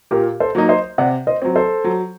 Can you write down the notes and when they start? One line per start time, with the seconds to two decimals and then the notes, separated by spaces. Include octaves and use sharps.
0.11 A#2 G4 A#4
0.40 A4 C5
0.55 F#3 A#3 D#4
0.69 C5 D#5
0.98 C3 D5 F#5
1.27 C5 D#5
1.42 F#3 C4
1.56 A4 C5
1.84 F#3